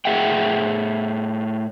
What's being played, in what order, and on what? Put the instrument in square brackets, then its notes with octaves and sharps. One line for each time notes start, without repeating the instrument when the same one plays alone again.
[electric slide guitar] A2 G#4 E5 F#5 G5